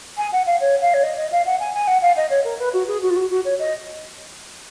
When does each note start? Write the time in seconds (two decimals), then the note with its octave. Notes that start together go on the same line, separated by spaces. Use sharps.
0.17 G#5
0.32 F#5
0.46 F5
0.60 C#5
0.81 F5
0.94 C#5
1.03 D#5
1.17 D#5
1.32 F5
1.46 F#5
1.60 G#5
1.74 G#5
1.87 F#5
2.02 F5
2.17 D#5
2.30 C#5
2.44 A#4
2.59 B4
2.73 F#4
2.87 G#4
3.02 F#4
3.10 F4
3.16 F#4
3.30 F#4
3.45 C#5
3.59 D#5